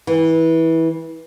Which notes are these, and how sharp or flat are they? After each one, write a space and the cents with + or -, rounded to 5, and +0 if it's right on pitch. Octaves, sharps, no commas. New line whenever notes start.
E3 -20